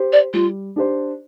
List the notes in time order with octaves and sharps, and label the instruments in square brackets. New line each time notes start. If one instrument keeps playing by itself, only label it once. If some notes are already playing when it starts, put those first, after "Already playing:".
Already playing: [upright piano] G4 C5
[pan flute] D5
[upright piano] G3 [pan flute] F4
[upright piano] D4 G4 C5